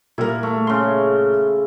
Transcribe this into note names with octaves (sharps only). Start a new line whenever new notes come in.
A#2 G3 E4 A#4
A3
C#3 C6